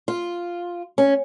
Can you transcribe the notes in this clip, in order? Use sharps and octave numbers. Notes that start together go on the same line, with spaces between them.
F4
C#4